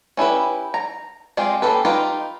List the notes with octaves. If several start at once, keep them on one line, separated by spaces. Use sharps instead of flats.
C#4 E4 G4 B4
A#5
G#3 C4 F4 G4
A#3 C#4 G4 A4 B4
D#4 F4 G4 B4